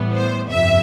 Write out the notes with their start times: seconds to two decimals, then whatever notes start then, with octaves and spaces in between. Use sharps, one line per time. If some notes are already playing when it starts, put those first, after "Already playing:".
Already playing: A2 E3 G3 B3
0.14 C5
0.49 G1 F2 C3 E5